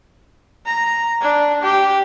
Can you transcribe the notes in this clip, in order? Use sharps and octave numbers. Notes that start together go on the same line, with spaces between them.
A#5
D4
G4